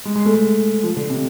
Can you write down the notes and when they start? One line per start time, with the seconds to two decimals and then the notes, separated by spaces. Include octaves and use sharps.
0.05 G#3
0.16 G#3
0.25 A3
0.35 G#3
0.84 F3
0.96 D3
1.10 C3